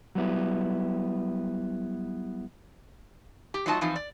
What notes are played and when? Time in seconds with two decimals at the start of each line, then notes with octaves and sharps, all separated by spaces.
0.15 F#3 G3 B3 E4
3.54 G4
3.66 F#3 A3 D#4 F4 D#5 A5
3.81 E3 F3 C4 D#4 F4
3.96 D5